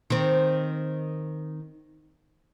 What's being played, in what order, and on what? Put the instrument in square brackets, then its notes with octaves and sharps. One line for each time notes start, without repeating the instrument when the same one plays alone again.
[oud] D#3 C4